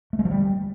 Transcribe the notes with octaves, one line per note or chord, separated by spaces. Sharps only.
A3
G#3
F3
G3